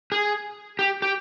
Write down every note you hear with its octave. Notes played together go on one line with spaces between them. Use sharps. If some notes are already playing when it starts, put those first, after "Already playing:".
G#4
G4
G4